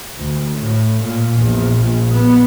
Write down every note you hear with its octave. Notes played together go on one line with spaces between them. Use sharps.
D2
A2
A#2
A#1 E2
A#1 A#2
B3